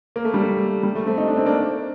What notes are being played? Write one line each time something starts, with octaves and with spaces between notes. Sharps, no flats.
A#3
A3
G3
A3
G3
A3
A3 C4
D#4
D4
C4
A#3 D4